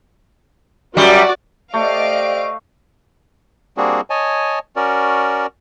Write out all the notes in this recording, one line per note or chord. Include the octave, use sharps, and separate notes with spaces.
F#2 G3 F#4 D5
A3 G4 C5 D5 D#5 F5 D7
G3 A#3 C4 D4 F#4 G#4
C#5 D#5 G#5 A5
C#4 F#4 A#4 D5